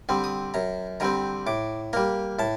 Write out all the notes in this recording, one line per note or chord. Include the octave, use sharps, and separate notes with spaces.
D3 G3 C4
D#6
F#2 A#5
D3 G3 C4 A#5
A2 D6
G3 A#3 A#5
A2 A5